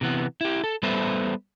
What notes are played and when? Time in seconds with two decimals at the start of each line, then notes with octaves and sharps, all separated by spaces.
0.01 C3 E3 B3
0.41 E4 G4
0.64 A4
0.83 G3 B3 A4 B4 C5 E5